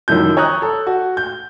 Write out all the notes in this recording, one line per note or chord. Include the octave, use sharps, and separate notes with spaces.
F#2 D#3 F3 E4 G6
C#5 A#5 D#6 F#6
A4
F#4
G6